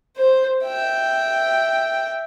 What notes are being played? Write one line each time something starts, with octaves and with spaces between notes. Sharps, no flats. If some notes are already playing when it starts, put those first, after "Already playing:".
C5
E5 G5